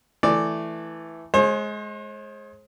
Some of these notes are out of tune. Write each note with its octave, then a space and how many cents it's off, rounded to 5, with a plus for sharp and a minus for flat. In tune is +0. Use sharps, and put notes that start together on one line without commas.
E3 +0 A3 +0 D5 +0
G#3 +20 C5 +45